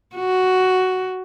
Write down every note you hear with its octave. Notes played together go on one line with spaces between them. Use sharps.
F#4